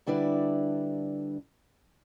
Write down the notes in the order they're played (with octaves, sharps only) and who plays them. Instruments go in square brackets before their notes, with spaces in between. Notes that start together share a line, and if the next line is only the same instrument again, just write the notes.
[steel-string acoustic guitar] D3 G3 D4 E4 B4 D5